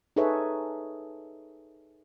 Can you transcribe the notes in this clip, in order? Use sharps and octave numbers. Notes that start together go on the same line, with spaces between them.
D#4 G#4 A4 B4 C#5 E5